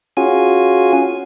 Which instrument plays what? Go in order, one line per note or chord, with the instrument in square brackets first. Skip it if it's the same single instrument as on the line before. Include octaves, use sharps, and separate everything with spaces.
[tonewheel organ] C#4 F4 F#4 G#4 G#5